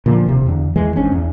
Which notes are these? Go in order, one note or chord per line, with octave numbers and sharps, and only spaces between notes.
A#2 D3 F3
D#1 C3
E2 D3
E2 E3 G#3
G#1 G#2 C#4 D4
E2